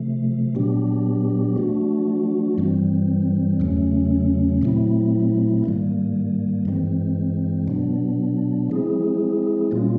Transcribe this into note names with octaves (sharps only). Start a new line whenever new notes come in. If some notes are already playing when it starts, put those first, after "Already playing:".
Already playing: C3 F3 A3
A#2 F#3 B3 D4 G4
F3 A3 D4 F#4
G2 E3 G3 C4
E2 C#3 F#3 A3 C#4
A#2 F#3 A3 C4 E4
G#2 D#3 G3 A#3
G2 E3 G#3 C4
B2 F#3 B3 D4
F3 G#3 C4 E4 G#4
A#2 G3 A#3 C#4 F4